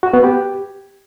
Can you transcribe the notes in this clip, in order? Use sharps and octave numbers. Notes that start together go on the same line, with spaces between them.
F#4
B3
G4